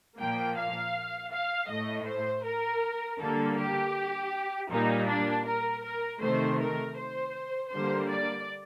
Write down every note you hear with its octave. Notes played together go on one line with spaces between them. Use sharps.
A#2 F3 A#3 G5
F5
F5
A2 A3 D#5
C5
A#4
D3 G3 A#3 A4
G4
A#2 G3 A#3 D#4
D4
A#4
A#4
C3 D#3 A3 C5
A#4
C5
D3 G3 A#3 C5
D5